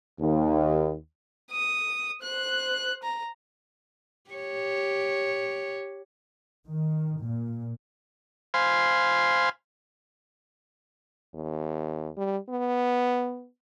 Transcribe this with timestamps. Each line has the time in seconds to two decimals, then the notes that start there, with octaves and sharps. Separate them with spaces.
0.20 D#2
1.51 D#6
2.23 C5 F#6
3.03 A#5
4.31 G4 C#5
6.65 D#3
7.21 A#2
8.54 C5 F5 G#5 B5 C6
11.34 D#2
12.17 G3
12.49 B3